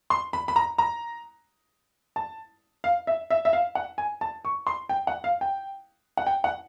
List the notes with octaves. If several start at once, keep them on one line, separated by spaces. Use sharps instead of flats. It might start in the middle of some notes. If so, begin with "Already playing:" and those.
C6
B5
B5
A#5
A#5
A5
F5
E5
E5
E5
F5
F#5
G#5
A5
C#6
C6
G5
F#5
F5
G5
F#5
G5
F#5